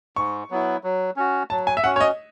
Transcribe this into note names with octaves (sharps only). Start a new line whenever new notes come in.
G#2 C#6
F#3 B3 E4
F#3
C#4 F#4
F#3 A5
G#5
E5
C#4 F#4 F#5
C#5
D#5